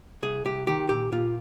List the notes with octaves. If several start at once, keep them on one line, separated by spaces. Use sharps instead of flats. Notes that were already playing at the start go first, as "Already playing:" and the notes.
C2 G#4
C2 G4
D#3 G4
A#2 G4
A#2 F4